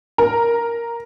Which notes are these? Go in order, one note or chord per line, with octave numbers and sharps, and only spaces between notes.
A#4